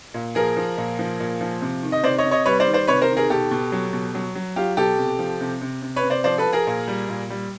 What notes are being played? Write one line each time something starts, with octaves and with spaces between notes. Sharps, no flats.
A#2
F3 G#4 A#4
F3
A#2
F3
A#2
F3
C3
D#3
D#5
C3 C5 D5
C#5 D#5
C3
C#5 D#5
G3 B4 C#5
C5 D5
D#3
C5 D5
C3 B4 C#5
A#4 C5
D#3
G#4 A#4
B2 G4 A4
B2
F#3
B2
F#3
F#3
F#3 F4 G4
B2 G4 A4
C3
F3
C3
C3
C3
B4 C#5
C3
C5 D5
F3 C5 D5
A4 B4
F3
G#4 A#4
A#2
G3
A#2
G3